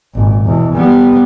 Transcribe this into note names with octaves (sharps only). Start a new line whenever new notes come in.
G#1 A#2
E2 B2
G3 B3